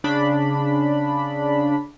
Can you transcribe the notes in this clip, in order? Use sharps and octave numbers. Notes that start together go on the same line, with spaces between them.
C#3 D4 B5